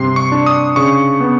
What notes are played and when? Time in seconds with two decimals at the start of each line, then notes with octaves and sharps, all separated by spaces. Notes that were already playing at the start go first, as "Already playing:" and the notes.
Already playing: G2 C3 C6
0.16 C#6
0.32 D4
0.46 D#6
0.76 C#3 C#6
1.20 B3